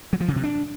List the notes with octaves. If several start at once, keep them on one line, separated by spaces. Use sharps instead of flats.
F#3
F3
C#3
C3
D4